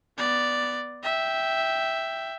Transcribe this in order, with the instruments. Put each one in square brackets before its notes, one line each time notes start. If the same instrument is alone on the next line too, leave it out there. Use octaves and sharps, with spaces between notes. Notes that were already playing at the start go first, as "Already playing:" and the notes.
[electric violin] B3 D5
E5 G5